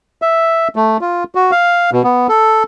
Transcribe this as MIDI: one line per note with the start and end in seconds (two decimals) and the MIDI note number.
0.22 0.68 76
0.76 0.97 57
1.01 1.24 65
1.35 1.51 66
1.51 1.90 77
1.93 2.02 47
2.04 2.27 59
2.29 2.63 69